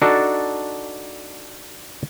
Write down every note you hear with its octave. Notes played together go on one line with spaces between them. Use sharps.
D4 D#4 F#4 A4